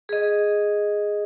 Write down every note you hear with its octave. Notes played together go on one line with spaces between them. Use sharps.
G#4 D#5